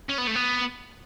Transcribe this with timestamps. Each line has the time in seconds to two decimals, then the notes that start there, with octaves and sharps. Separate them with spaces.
0.09 C#4
0.18 B3
0.27 A3
0.35 B3